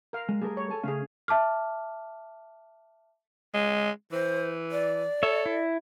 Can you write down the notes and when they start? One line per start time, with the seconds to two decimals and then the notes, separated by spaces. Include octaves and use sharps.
0.13 A#4 F5
0.29 G#3
0.41 G3 A3 G#4 A#4
0.57 C#5
0.70 A4 G#5 A5
0.83 C#3 A3 C#4 G#4 F5
1.28 E5 A5 D6 F6
3.54 G#3
4.12 E3 C5
4.71 D5
5.23 A4 C#5 E5
5.46 E4